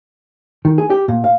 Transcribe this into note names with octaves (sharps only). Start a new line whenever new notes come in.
D#3
G#4
G4
A#2
F5